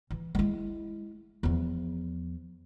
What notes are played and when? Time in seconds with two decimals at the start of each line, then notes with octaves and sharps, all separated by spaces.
0.10 E3
0.35 G#3 E4
1.43 E2 F3